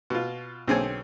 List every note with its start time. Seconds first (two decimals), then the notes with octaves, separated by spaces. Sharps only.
0.10 B2 F4
0.67 B1 D3 C4 G#4 C#5 G#5